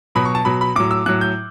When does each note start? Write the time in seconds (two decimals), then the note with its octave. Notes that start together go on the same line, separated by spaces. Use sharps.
0.15 B2 F#3 B5
0.25 C#6
0.35 A5
0.45 B2 F#3 B5
0.61 B5
0.76 A2 F#3 D6
0.91 E6
1.06 A2 F#3 F#6
1.21 G6